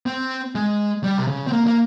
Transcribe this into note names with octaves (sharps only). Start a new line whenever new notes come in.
C4
G#3
G3
C3
C#3
C4
A#3
A#3